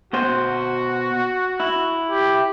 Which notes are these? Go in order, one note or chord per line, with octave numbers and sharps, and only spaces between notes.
B2 F#4 C5
E4
G4